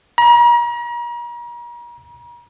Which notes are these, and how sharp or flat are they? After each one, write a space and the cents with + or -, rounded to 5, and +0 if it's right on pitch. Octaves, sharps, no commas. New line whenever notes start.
A#5 +40